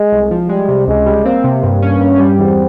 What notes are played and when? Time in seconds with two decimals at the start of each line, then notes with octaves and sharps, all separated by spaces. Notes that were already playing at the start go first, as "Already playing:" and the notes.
Already playing: G#3
0.12 C2
0.31 F3
0.49 G3 G#3
0.68 C3
0.87 C#2 G#3
1.06 G3
1.25 A#3 C4
1.44 C3
1.63 G2
1.82 C#4
2.01 G2
2.19 G3
2.38 E2 C4